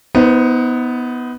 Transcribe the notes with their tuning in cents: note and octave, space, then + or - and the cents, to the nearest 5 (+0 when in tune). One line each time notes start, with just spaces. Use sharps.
B3 +0 D#4 +35 C5 -25